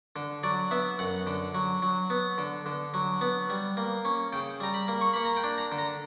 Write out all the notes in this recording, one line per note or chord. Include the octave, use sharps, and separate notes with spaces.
D3
F#3 D5
B3 E5
F#2 F#5
D3
F#3
F#3
B3
D3
D3
F#3
B3
G3
A#3
C#4
C#3 G5
G3 A#5
B5
A#3
C#6
A#3 B5
A#5
G5
D4
A#5
D3
A#5